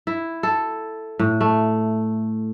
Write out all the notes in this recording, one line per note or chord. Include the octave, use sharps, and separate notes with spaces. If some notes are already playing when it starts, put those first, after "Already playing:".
E4
A4
A2
A3